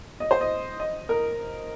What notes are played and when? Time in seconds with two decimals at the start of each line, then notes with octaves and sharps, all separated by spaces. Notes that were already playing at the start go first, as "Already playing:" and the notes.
0.20 D#5
0.31 C5
0.41 D#5
0.80 D#5
1.09 A#4